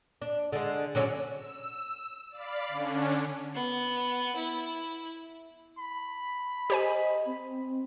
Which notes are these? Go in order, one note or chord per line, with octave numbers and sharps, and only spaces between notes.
D4
D3 G#3
D3 F#3 C#4
E6
D5 F5 B5
D3 C#4 D4
B3
E4
B5
G4 C5 D#5 G#5
C4